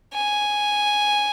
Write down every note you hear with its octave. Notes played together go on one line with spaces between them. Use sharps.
G#5